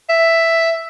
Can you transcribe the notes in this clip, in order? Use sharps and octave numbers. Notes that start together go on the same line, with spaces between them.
E5